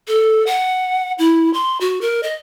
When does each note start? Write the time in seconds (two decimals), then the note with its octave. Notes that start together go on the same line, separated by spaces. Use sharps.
0.08 A4
0.47 F#5
1.19 E4
1.54 C6
1.81 F#4
2.01 A#4
2.23 D#5